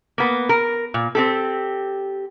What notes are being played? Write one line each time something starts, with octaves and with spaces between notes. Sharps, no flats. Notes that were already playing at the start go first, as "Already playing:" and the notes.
A#3 B3
A#4
A#2
C4 G4 A4